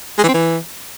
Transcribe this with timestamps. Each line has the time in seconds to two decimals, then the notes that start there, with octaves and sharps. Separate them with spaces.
0.19 G#3
0.24 E3
0.29 C4
0.34 E3